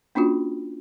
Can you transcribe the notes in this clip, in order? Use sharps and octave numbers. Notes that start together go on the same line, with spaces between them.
A#3 C#4 D4 F4 F#4